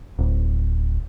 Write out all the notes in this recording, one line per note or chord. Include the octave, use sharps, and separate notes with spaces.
D1